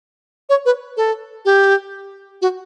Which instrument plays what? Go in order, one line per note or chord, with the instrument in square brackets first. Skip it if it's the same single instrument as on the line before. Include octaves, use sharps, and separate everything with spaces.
[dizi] C#5
B4
A4
G4
F#4